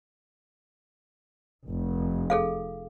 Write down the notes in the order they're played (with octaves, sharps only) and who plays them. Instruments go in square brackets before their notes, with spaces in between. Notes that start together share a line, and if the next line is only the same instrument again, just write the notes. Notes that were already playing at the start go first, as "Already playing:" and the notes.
[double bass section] F1
[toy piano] G#4 A4 F5